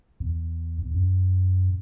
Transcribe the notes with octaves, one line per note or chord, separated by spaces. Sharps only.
E2
E2
F#2